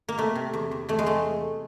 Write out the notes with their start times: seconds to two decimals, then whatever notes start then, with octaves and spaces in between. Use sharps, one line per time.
0.08 A#3
0.18 C3 A3
0.35 C3
0.53 E2
0.71 E2
0.89 E2 A3
0.99 G#3
1.06 C3 A3